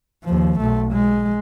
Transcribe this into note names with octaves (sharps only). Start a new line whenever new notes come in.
D#2 F3
B1 A3
G#3